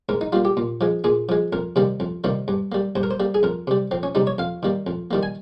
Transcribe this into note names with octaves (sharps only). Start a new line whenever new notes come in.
G#2 A#4
D#4
G3 A#3 F4
G4
A#2
F3 G#3
A#2 G#4
F3 G#3
F2 A#4
C3 D#3 G3 A#3
F2
C3 D#3 G3 A#3
G2
G3 A#3
G2 C5
A#4
C5
G3 A#3
G#4
F2 A#4
C3 G3
F2 C4
C#4
C3 G3 D#4
C#5
F2 F5
D#3 G3 A#3
F2
D#3 G3 A#3
G#5